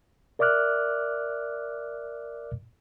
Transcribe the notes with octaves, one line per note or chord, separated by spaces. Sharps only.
A#4 D5 E5 D6 F6 F#6